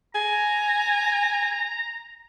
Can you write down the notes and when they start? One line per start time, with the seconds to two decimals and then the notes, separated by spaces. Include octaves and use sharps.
0.15 G#5 A#5